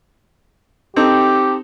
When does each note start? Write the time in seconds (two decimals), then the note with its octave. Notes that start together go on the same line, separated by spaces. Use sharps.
0.96 C4 D#4 G4 A4